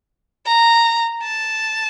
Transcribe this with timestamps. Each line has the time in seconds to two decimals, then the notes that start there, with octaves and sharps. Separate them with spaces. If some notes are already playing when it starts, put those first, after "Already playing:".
0.46 A#5
1.23 A5